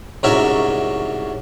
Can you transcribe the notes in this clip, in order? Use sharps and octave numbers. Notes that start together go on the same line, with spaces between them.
C2 G#2 C#4 F#4 A#4 E5